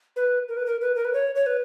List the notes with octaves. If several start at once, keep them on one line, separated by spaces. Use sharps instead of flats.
B4
A#4
B4
A#4
B4
A#4
B4
C#5
C#5
B4